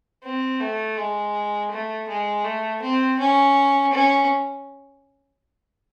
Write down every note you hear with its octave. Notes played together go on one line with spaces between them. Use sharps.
C4
A3
G#3
A3
G#3
A3
C4
C#4
C#4